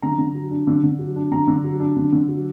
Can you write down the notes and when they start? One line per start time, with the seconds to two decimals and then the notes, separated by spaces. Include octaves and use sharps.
0.02 D3 A#5
0.18 D3
0.35 F#3
0.51 D4
0.67 D3
0.83 D3
0.99 F#3
1.16 D4
1.31 D3 A#5
1.47 D3
1.64 F#3
1.80 D4
1.96 D3
2.12 D3
2.28 F#3